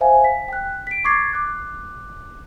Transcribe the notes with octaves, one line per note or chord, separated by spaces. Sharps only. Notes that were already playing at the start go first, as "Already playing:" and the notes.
C5 E5 F5 G#5
B6
G5 F#6
B6 D7
C#6 D6 G#6 A6 C7
D6 F#6